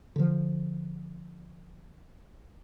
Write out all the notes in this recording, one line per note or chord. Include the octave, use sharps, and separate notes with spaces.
D3 F3